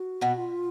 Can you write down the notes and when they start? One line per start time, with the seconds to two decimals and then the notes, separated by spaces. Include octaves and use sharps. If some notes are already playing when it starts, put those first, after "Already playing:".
Already playing: F#4
0.21 B2 B3
0.37 F4